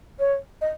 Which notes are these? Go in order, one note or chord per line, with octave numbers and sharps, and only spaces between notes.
C#5
D#5